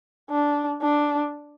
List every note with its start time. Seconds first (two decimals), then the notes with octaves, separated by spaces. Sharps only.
0.30 D4
0.82 D4